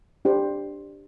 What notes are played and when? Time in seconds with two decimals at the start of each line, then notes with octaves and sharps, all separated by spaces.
0.25 D4 G4 C5